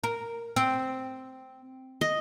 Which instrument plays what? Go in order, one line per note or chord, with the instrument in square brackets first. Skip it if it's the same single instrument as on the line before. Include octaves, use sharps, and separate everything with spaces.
[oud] A#4
C4
[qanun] D#5